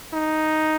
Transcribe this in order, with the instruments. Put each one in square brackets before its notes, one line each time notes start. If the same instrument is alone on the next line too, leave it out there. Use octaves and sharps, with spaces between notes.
[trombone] D#4